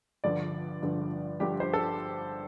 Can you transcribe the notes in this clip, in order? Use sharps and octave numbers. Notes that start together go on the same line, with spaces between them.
G1 G2 D3 F3 D5
G1 G2 D3 F3
G1 G2 D3 F3 G4
C5
A4